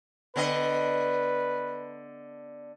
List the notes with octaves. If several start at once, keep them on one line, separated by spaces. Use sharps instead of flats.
D3 B3 B4 D#5